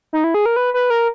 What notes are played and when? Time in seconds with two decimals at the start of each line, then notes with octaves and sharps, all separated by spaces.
0.13 D#4
0.24 E4
0.34 G#4
0.46 A#4
0.56 B4
0.74 B4
0.90 A#4